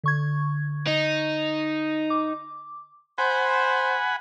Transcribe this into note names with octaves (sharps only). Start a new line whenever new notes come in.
D3 C#6 G#6
D#4
D6
C5 F#5 G#5 B5